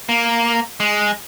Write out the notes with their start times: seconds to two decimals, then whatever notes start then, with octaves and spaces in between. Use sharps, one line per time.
0.09 A#3
0.80 G#3